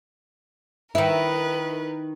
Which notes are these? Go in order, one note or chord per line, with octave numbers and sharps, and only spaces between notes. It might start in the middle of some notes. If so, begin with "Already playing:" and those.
D#3 E4 A#4 B4